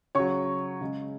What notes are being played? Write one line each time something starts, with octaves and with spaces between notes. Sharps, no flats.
C#3 F#3 C#5 C#6
C#3 G#3